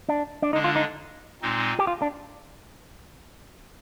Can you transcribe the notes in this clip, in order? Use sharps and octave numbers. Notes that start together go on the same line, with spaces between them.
D4
D4
D3 G#3 D4 D#4
F4
D#4
A#2 G#3 C4 D#4
G4
F4
D4